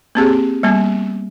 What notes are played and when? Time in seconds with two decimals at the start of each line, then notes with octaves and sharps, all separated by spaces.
0.15 A#3 C4 G4 G#4
0.63 G3 A#3 B3